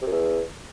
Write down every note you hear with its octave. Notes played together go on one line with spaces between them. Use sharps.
C3
F#2
E2